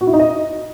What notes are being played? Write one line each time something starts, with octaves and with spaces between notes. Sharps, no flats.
F#4
E4
D#4
D#5